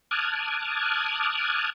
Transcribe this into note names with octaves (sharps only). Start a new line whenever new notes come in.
A5 D6 D#6 F6 F#6 G#6